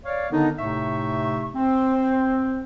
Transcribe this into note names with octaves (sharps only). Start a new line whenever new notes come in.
C#5 D5 F5
D3 D#3 B3 D4 D#4
A2 C3 A3 D#4 E5 C#6
C4